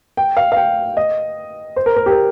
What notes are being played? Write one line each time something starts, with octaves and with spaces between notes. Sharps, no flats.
G5
F5
F5
G5
D#5
C5
A#4
A#4
G4
A#4